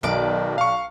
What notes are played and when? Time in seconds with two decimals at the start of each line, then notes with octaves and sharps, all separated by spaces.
0.03 B1 B2 D#3 D5 D6
0.58 F5 C#6